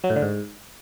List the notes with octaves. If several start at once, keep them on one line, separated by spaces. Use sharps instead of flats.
F#3
A2
D3
G#2